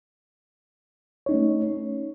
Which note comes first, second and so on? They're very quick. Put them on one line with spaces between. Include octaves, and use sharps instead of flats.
C#5 D#4 C#4 A3